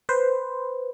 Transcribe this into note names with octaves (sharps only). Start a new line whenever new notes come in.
B4 C5